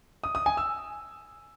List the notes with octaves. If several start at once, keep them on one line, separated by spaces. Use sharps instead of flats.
D#6
D#6
G#5
E6